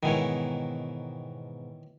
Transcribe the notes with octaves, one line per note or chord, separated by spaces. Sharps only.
G#2 B2 D#3 E3 C#5